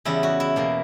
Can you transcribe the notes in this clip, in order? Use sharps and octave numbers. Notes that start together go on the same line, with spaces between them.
E2 C#3 G3 E4
F#4
E4
E2 B2 A#3